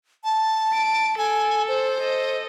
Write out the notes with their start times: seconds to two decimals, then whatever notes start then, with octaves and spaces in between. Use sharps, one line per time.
0.24 A5
0.74 D7
1.18 A4 G#5
1.68 C5
2.00 A4 D#5